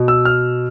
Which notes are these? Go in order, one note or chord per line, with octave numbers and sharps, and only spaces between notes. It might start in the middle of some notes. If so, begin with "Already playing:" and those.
Already playing: B2
E6
F6